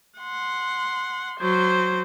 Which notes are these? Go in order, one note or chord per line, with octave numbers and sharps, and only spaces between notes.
F#5 C6
F#3 C5